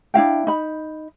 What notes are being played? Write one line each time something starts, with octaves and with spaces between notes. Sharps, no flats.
D4 E4 F5 G5
D#4 B5